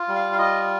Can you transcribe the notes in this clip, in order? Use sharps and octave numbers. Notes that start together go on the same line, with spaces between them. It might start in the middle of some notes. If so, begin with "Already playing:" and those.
Already playing: F4
G3
F5
F5
F4 D#5